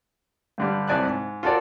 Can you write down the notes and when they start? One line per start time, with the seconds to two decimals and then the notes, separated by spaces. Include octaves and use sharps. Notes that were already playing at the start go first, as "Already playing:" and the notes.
0.58 G2 D3 G3
0.88 C2 C3 D5 G#5 A5 F#6
1.05 G#2
1.43 F4 F#4 A4 A#4 C#5 D5